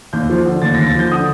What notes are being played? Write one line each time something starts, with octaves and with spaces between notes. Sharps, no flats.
D#2 G6
F3
D3
D#2 A6
D#2 A#6
A6
F3 G6
D3 D#6